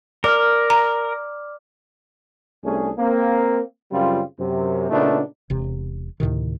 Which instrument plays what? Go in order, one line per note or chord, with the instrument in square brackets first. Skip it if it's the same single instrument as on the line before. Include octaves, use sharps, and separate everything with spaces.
[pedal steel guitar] A#4 [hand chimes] D5 D6 F6
[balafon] A#5
[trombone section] C2 A3 C#4 D4 G#4
A#3 C4
F#2 C#3 G3 C4 F4
F#2 C3
A#2 C#3 A3 B3 D4 D#4
[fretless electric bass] E1 C3
D2 A2 C3 D#3